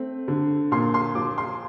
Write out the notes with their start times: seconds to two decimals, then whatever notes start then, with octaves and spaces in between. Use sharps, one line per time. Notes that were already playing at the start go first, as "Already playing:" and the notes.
Already playing: A3 C4
0.28 D3
0.72 A#2 C6
0.94 C6
1.15 F3 D6
1.38 C6